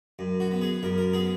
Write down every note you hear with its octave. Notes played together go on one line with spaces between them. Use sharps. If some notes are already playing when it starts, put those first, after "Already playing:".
F#2
F#4
B3
G#4
F#2 A#4
A#4
B3 G#4